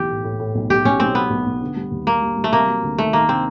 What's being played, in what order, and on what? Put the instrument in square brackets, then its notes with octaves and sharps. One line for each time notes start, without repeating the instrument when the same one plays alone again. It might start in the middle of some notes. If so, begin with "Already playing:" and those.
Already playing: [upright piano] B1 E3 [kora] G4
[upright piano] A2
A2
A2
B1
[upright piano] B1 [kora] G4
[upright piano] B1 [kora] C#4
[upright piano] B1 [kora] C4
[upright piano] F#3 [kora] B3
[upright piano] B1
B1
D3
G3
D#2
[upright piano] G3 [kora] A#3
[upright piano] G3
G3
[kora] A3
[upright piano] C3 [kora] A#3
[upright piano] F#3
D2
[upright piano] D#3 [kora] A3
[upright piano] D#3 [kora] A#3
[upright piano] C3 [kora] C4